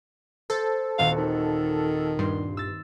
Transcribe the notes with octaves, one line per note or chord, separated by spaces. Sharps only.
A4 C5 A6
D#1 C4 F#4 F5
D#3
G2 C6
E6 A6